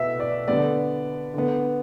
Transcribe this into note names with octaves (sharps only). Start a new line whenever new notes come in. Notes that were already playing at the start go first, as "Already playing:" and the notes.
Already playing: B2 B3 E5
D5
D3 G3 B3 D5
D3 B3